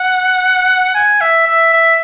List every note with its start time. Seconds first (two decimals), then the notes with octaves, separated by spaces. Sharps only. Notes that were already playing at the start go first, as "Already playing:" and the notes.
Already playing: F#5
0.95 G#5
1.21 E5
1.47 E5
1.73 E5